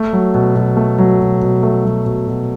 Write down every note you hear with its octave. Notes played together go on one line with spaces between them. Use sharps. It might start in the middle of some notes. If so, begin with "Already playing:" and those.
Already playing: A3
F#3
B2
B2
A3
F#3
B2
B2
A3
F#3
B2
B2